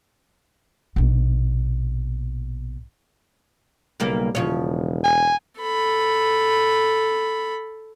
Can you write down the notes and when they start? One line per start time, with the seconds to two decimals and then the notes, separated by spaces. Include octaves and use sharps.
0.96 A#1 B2
4.00 B1 C#3 G3 A#3
4.35 E1 C#3 F3 C#5
5.04 G#5
5.61 A4 B5